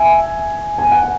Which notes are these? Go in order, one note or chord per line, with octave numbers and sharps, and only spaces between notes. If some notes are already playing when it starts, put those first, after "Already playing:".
Already playing: E5 G#5
G#5
F#5